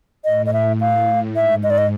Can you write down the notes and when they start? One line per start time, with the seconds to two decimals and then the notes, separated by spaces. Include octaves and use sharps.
0.25 A2 D#5
0.46 D#5
0.53 E5
0.81 F5
1.36 G#2 E5
1.64 D#5
1.70 D5
1.78 D#5